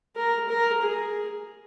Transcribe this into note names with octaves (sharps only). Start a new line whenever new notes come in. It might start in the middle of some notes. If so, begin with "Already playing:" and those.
A#4
A#4
G#4